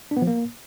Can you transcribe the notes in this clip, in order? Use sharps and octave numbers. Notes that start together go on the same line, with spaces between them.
D4
B3
F3
A#3